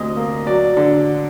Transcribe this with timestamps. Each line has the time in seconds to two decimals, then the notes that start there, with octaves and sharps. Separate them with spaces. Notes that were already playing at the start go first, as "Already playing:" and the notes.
Already playing: D2 C3 D#5
0.17 A#3
0.46 F#3 D5
0.77 D3